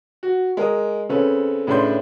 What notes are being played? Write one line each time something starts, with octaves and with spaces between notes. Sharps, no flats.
F#4
G#3 A#4 D#6
C#3 C4 C#4 A4 B4
A2 C#3 D4 B4 C6 G6